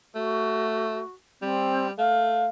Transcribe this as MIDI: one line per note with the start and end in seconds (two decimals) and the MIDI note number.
0.15 1.02 57
0.15 1.10 66
1.42 1.91 55
1.42 1.88 60
1.98 2.48 57
1.98 2.47 77